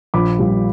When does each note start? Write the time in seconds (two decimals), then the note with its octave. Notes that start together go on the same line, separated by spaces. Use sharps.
0.14 A#1 B5 D6
0.39 A#2 G3